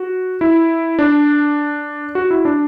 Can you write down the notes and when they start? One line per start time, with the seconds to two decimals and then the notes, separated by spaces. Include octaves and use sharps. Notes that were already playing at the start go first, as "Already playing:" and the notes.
Already playing: F#4
0.41 E4
0.99 D4
2.15 F#4
2.31 E4
2.45 D4